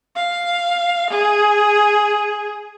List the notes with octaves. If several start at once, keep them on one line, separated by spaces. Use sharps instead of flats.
F5
G#4